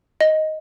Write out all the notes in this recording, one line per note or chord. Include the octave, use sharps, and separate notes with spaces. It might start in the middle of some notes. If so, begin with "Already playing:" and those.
D#5